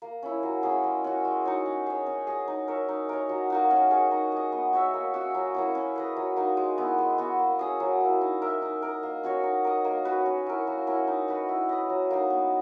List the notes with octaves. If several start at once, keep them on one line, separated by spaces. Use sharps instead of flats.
A#3
C#4 E4
F#3
A#3 C#4 G#4
G#3
C#4 F#4
G#3
D#4 F#4 C#5
C#4
G#4 C#5
C#4
G#4 D#5
D#4
A#4 C#5 E5
D#4
A#4 C#5
F#3
A#3 D#4 F#4
C#4
G#4 C#5
D#4
G#4 D#5
B3
F#4 C#5 E5
A#3
C#4 F#4
F#3
A#3 C#4 E4
C#4
G#4 B4 D#5
F#3
A#3 D#4
G#3
B3 E4
G#3
B3 F#4
A#3
C#4 G#4 D#5
F#3
A#3 E4
D#4
A#4 E5
D#4
A#4 D#5
A#3
C#4 F#4 C#5
D#4
A#4 D#5
A#3
C#4 F#4 B4
C#4
E4 A#4
A#3
C#4 E4 A#4
D#4
F#4 B4
E4
B4 D#5
F#3
A#3 D#4
B3